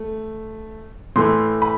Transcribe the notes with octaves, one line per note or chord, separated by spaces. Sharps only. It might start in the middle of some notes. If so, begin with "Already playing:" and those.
Already playing: A3
A2 E3 A3 C6
B5